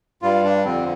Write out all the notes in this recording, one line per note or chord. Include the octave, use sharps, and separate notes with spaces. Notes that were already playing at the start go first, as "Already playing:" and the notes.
G2 G3 F4
D4
F2 D3 F3 C4